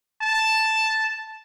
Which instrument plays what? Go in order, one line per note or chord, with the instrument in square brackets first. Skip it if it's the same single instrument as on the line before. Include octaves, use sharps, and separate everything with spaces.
[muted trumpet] A5